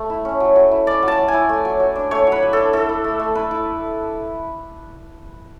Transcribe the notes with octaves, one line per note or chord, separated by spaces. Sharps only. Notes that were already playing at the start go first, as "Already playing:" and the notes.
Already playing: A3
E4
C#4
F#3
F#3
E4
C#4 D5
F#3
A5
F#3
G#5
E4
A3
F#3
F#3
D4
A3 C#5
F#3
B4
F#3
A4
D4
E4 A4
E4
A3
A3
E4 B4
E4